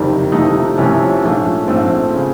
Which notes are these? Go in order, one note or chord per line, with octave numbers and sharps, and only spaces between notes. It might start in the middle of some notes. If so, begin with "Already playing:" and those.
Already playing: F#1 F2 C3 D#3 G3 D#4
C2 C3 F3 A3 D#4
C2 C3 F3 A3 C#4
A#1 G#2 F3 A3
A#1 G#2 F3 A3 C4
C#3